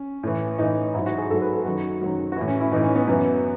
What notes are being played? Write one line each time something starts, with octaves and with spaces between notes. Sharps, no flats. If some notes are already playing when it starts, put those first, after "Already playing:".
Already playing: C#4
A2 E3
A2 E3 D#4
G#2 F#3 E4
F#4
G#4
G#2 F#3 A4
B4
A4
F#2 D#3 F#3 F#4
F#2 D#3 F#3
F#4
A2 E3 E4
C#4
E4
A2 E3 D#4
C#4
B3
F#2 E3